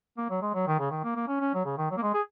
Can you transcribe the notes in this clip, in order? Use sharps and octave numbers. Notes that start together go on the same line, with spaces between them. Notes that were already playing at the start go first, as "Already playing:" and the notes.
A#3
F#3
G#3
F#3
D#3
C#3
D#3
A#3
A#3
C#4
C#4
F#3
C#3
D#3
F#3
A#3
G#3
G#4